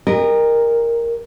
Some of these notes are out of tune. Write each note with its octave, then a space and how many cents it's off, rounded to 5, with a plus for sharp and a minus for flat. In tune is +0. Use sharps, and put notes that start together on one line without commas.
G4 +40 A#4 +0 D#5 -25